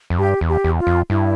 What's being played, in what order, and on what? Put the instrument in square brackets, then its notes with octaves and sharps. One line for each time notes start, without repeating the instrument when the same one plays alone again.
[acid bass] F2
[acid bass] G2 [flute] G4
[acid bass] E2
[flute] G4
[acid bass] E2
[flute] F4
[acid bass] F2
[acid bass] G2 [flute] E4